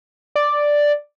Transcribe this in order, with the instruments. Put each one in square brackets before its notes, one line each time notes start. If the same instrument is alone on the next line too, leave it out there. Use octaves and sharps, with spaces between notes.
[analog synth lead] D5